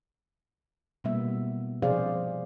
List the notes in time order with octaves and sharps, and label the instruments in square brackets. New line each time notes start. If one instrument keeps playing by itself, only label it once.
[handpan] B2 G3 A#3 B3 E5
C3 F3 G#4 C5 D5 F5